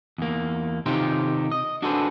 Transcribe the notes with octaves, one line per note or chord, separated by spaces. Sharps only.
E2 A#3
C3 D#3 D#4 F4 G4 C5
D#5
D4 F#4 G#4 A4 B4 C5